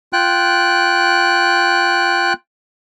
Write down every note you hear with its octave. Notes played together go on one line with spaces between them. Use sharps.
F4 G5 F#6